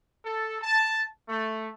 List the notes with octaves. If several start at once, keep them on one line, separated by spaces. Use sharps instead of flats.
A4
A5
A3